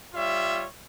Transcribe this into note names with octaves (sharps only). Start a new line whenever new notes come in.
G3 F4 C#5 E5